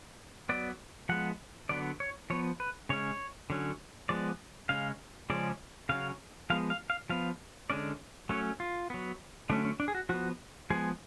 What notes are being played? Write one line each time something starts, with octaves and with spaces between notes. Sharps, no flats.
F#3 B3 D5
F3 G#3 B3 F#5
D3 F#3 B3 D5
C#5
F3 B3 C#5
B4
C#3 G#3 C#4 C#5
D3 F#3 C#4
F3 G#3 B3 D5
C#3 G#3 C#4 F5
C#3 F3 G#3 C#4 D5
C#3 F#3 C#4 F5
F3 G#3 B3 F5
F5
F5
F3 B3 F5
D3 G#3 C#4 D5
F#3 A3 C#4 C#5
F4
F#3 B3
D3 F#3 A3 C#4 D4
C#4
D4
G#4
F#4
F3 B3 F#4
F3 G#3 B3 G#4